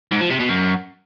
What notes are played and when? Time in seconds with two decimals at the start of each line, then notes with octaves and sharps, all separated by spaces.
0.11 G#2
0.21 F3
0.30 C3
0.39 B2
0.49 F#2